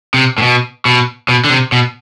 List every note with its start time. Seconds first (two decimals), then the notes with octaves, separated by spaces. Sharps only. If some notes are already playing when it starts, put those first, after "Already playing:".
0.14 C3
0.38 A2
0.42 B2
0.85 B2
1.29 B2
1.44 D3
1.50 C3
1.72 B2